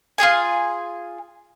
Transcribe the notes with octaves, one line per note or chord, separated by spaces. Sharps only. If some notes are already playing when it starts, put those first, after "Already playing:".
F4 G4 G#4 G#5